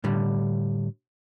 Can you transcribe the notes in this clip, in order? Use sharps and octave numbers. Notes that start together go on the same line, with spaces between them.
A2 D3 G3